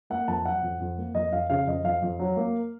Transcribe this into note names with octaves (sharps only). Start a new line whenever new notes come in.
A#3 F#5
F2 A5
F#3 F#5
F2
F2
A#3
F2 D#5
F2 F5
C#3 F5
F2 D#5
F2 F5
F2
F#3
A#3